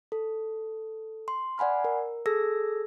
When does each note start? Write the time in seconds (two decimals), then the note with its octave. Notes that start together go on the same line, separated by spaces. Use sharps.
0.12 A4
1.28 C6
1.58 D5 F#5 G#5 B5 F6
1.84 A#4
2.26 G#4 A4 E6 G#6 A#6